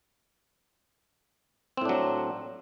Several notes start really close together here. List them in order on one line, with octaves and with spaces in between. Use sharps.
C4 A2 D4 F#3